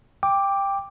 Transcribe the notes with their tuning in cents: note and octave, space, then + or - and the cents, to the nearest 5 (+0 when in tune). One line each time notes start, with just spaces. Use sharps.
G5 +15 D6 +0